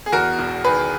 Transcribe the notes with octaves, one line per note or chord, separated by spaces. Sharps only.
G#4
E2 F#4 A#4
E1
D#3 G#4 B4